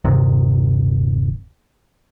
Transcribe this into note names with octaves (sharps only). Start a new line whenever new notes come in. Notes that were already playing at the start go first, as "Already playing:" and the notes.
D#1 G2 C3 D#3